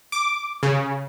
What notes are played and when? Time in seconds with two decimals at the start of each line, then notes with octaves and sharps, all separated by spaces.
0.12 D6
0.63 C#3